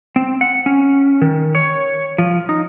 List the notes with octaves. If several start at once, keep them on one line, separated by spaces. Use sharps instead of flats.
C4
F#5
C#4
D#3
C#5
F3
D#4